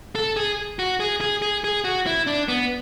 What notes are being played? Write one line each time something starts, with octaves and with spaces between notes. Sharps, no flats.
A4
G#4
F#4
G#4
G#4
G#4
G#4
F#4
E4
D4
B3